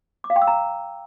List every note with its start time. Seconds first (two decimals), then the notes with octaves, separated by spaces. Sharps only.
0.24 D6
0.30 F5
0.36 G5
0.42 E6
0.47 A#5